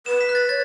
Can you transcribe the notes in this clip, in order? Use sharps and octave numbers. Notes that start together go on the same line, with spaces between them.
B4 E7
B6
F#6
A6
C#5 A6